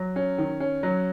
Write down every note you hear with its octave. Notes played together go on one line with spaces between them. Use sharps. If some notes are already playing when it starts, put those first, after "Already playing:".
Already playing: F#3
C#4
D#3
C#4
F#3